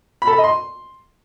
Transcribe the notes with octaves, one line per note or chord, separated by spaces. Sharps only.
B5
A4
B5
D#5
C6